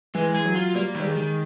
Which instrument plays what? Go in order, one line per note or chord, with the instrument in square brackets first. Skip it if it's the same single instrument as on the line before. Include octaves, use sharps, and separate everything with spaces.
[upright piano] E3 [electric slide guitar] G#3
[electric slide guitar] G#4
[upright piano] F#3
[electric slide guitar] F4
[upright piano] G3 [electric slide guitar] A#3
[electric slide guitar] D#3 [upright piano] G3
[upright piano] G#3
[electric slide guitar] D#3